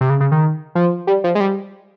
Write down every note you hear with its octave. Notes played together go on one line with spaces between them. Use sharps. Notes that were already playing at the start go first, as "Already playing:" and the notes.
C3
C#3
C#3
D#3
F3
G3
F3
G#3
G3